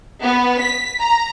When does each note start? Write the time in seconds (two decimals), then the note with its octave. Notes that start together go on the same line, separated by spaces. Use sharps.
0.22 B3
0.59 B6
1.00 A#5